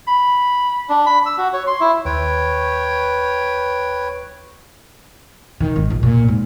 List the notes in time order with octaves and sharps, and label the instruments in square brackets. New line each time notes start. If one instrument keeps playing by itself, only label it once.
[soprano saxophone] B5
[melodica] D4
B5
E6
F#4
C#5
C6
E4
[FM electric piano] D#2 [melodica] B4 C#5 G5
[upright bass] D#3
G#1
A#1
A#2
G#2